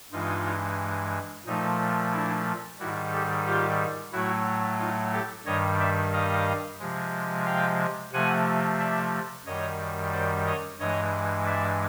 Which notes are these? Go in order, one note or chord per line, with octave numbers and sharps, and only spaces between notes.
G2 E3 G#3 D#4 F4
A#2 F3 A3 D#4
D4 E4
G#2 D#3 G3 E4 F#4
G4 A4
F4 G4
A2 F#3 A3 E4 F#4
D#4 F4
G4 A4
G2 D#3 G3 C#5 D#5
D5 E5
D#5 F5
C3 F3 G#3
F5 G5
C3 F3 A3 F#5 G#5
D5 E5
F#2 D#3 G3 C#5 D#5
C5 D5
C#5 D#5
G2 E3 G#3 C#5 D#5
D5 E5